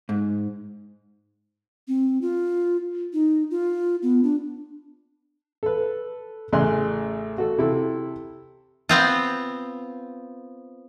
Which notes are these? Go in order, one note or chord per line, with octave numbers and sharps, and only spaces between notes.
G#2
C4
F4
D#4
F4
B3
D4
A4 B4
A1 C#3 A3 G#5 C6 F#6
F#4 A4
C3 E4 A4
B3 C4 F4